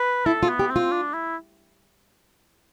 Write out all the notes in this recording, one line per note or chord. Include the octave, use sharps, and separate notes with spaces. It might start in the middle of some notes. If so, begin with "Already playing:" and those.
Already playing: B4
E4 A4
F4
B3
G4
C4
F4
D4
E4